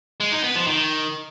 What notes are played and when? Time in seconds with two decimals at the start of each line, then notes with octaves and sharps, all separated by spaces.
0.20 G#3
0.32 D#4
0.44 B3
0.55 F3
0.67 D#3